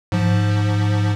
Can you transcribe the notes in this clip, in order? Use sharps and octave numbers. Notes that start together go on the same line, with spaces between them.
G#2 F3